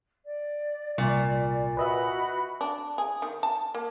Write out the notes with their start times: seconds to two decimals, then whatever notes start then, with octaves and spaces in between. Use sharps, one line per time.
0.26 D5
0.98 C2 A#2
1.77 F#4 B4 D#5 E5 B5
2.61 D4
2.98 G#4
3.22 D#3
3.43 A5
3.74 A#3